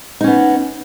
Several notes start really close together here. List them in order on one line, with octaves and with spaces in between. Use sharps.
D#4 C#4 B3